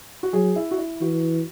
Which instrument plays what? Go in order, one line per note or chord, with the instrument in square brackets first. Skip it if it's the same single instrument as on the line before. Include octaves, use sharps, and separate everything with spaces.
[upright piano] F#4
[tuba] F#3 [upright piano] G#4
[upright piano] E4
F#4
E4
[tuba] E3 [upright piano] F#4